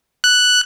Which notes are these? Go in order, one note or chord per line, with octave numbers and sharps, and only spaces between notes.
F#6